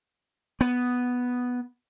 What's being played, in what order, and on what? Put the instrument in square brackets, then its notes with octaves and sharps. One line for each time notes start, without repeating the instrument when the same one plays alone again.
[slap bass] B3